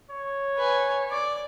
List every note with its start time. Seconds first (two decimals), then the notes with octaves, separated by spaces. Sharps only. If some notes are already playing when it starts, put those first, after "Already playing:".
0.11 C#5
0.57 B4 G#5
1.10 D5